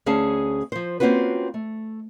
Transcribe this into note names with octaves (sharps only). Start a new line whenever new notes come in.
D2 C#4 G#4 F5 A5
F3 C5
A#3 C4 C#4 F4 F#4 B4
A3